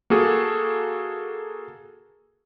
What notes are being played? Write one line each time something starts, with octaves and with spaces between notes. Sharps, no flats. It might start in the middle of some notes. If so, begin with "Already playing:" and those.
A#3 F#4 G#4 A4